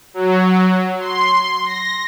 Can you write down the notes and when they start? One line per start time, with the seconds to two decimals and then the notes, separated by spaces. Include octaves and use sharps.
0.14 F#3
1.00 C6
1.65 A#6